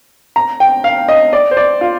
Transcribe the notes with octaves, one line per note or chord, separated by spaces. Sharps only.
A#5
G5
F5
D#5
D5
C5
D5
F4